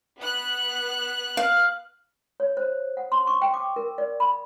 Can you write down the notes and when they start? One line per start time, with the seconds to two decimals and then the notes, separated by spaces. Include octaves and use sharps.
0.18 B3 F#6
1.37 F5
2.40 C#5
2.57 C5
2.97 F#5
3.12 C6
3.27 C#6
3.42 G5
3.54 D6
3.76 A#4
3.98 D5
4.20 B5